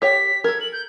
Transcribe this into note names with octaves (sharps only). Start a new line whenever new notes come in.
G4 C#5 G5 B6
A4 A#4 G#6
F#7
G6